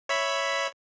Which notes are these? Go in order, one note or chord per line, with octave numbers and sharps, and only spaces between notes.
C#5 E5 B5